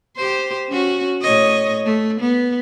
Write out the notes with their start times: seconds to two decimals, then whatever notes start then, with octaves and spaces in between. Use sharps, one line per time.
0.17 G4 C5
0.69 C#4 F#4
1.22 A2 C#5 D#5
1.85 A3
2.20 B3